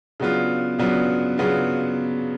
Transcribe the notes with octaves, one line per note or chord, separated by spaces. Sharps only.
C#3 F#3 B3 D4 F4
C#3 F#3 B3 D4 F4
C#3 F#3 B3 D4 F4